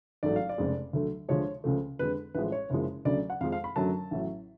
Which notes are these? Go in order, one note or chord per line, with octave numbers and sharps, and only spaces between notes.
A1 G#2 F#3 A3 D5
F5
D5
F1 F2 C#3 G#3
D2 D3 F#3 A3
D2 D3 F3 G#3 C#5
C#2 C#3 F3 A3
F2 D3 G#3 B4
A1 A2 F3 G#3 B4
C#5
F#1 F#2 F3 G#3
D2 C#3 F#3 A3 D5
F#5
F2 F3 G#3 F5
F5
B5
F#2 D3 F#3 A3 A5
A1 A2 F#3